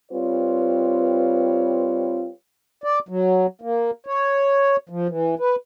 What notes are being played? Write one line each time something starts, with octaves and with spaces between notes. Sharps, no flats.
G3 C4 F4 B4 C#5
D5
F#3
A#3
C#5
F3
E3
B4